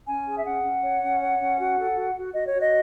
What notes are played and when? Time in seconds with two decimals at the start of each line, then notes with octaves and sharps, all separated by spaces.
0.06 C#4 G#5
0.26 G#4
0.39 E5
0.45 C#4 F#5
0.63 C#4
0.83 C#5
1.02 C#4
1.20 C#5
1.39 C#4
1.59 F#4
1.77 A4
1.96 F#4
2.16 F#4
2.34 F#4 D#5
2.48 C#5
2.53 F#4
2.62 D#5